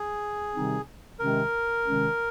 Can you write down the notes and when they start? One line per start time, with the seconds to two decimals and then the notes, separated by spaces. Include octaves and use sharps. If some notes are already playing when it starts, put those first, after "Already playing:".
Already playing: G#4
0.55 C3 D#3 G3 C4 D#4
1.19 C3 D#3 G#3 C#4 A#4
1.84 C3 D#3 G#3 C#4